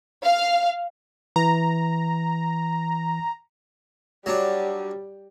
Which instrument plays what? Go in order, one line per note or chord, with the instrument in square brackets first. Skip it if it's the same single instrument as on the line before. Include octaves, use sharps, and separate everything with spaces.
[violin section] F5
[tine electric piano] E3 [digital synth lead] A#5
[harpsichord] F#3 D4 [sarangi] G3